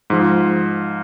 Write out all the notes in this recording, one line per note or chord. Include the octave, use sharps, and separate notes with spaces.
G#2 F3